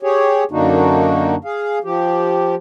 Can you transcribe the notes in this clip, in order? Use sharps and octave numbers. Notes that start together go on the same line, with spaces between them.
G4 G#4 C#5
F#2 D3 A#3 D4 D#4 F#4
G#4 F5
F3 G4